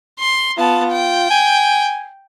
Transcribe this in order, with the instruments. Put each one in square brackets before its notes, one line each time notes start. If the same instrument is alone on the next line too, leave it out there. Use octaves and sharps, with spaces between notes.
[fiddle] C6
[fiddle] B3 A5 [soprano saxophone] F4
[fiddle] G5
[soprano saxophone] G#5